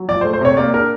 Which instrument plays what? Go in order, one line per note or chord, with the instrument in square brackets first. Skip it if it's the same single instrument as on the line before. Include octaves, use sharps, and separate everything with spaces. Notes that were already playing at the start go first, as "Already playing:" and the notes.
Already playing: [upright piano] F#3
F3 D5
A3 C5
C5
C3 C#5
A#3 D5
D4 A#4